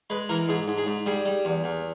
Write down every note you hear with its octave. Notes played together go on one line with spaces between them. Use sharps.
G#3 B4
E3 A#4
G#2 G#4
G#2
G#4
G#2
G3 G#4
G3
E2
E2